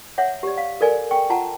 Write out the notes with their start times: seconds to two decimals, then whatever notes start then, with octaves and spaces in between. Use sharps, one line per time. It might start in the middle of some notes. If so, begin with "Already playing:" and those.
0.18 C#5 E5 F#5
0.43 G4 D5
0.58 F5
0.81 A4 A#4 D5 G#5
1.11 G5 C#6
1.30 F4 F#5 A5 A#5